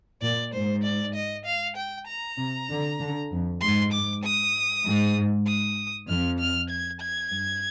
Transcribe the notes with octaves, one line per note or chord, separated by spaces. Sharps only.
A#2 D5
G#2 C5
D5
D#5
F5
G5
A#5
C3
D3
D3
F2
G#2 C6
D6
D#6
G#2
D#6
F2 F6
F6
G#6
G#6
G2